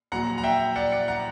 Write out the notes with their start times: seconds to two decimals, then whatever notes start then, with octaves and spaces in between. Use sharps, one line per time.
0.12 A#1 A#2 F#3 F#5 A#5
0.38 A#5
0.44 E5 G5
0.76 D5 F#5
0.92 D5 F#5
1.08 F#5 A#5